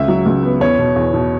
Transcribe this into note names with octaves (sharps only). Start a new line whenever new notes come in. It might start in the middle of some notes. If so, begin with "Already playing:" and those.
Already playing: C#2 E5
F#3
C#2
B3
E2 C#5
B2
E2
B2